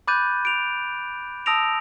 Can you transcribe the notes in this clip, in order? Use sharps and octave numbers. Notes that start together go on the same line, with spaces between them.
B5 D6 F#6 G6 A6 D#7
D7 F7
A5 D#6 E6 A#6 D7 F7